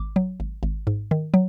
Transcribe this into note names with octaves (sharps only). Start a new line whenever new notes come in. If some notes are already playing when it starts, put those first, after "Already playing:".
Already playing: G#1 D6
F#3
G#1
G#1
G#2
D#3
F#3